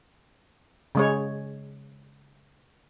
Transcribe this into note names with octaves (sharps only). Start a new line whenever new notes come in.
C#3 G#3 C#5